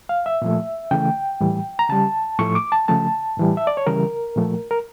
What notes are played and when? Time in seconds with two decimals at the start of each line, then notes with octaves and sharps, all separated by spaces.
0.09 F5
0.26 E5
0.42 A#2 F3 A3
0.91 C#3 E3 A3 G5
1.40 A2 E3 G3
1.79 A#5
1.89 C#3 G3 A5
2.39 A2 F3 A3 C#6
2.55 D6
2.72 A5
2.88 C#3 F3 A3 A5
3.37 A2 E3 G3
3.57 E5
3.67 D5
3.77 C#5
3.87 C#3 E3 G3 A#4
4.36 A#2 F3 A3
4.71 A#4